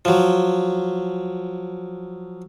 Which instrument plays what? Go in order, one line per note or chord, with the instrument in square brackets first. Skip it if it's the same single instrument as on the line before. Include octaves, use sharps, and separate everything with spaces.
[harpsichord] F3 F#3